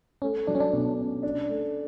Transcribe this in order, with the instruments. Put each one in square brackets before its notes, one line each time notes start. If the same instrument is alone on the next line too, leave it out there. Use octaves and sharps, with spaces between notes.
[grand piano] A3 [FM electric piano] C#4
[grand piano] F#3 [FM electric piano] D4
[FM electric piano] C#4
D4
[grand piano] B2
C#4
D4
A3